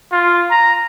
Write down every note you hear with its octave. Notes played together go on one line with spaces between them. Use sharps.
F4
A#5